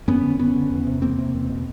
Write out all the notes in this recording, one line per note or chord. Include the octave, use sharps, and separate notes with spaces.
F#2 B3 C#4
D3
F#2 B3 C#4
D3
E2
C3
E2 A#3 C4
C3
E2
B2